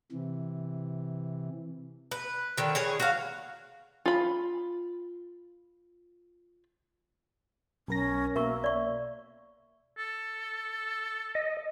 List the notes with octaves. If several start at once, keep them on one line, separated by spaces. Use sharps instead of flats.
C3 E3
B4
D3 D#3
E3 G#4 C#5
F#4 F5
F4 B5
B1 C#4 A#4 A#6
B2 A#3 A#4 E5 C#6
D5 C#6
A4
D#5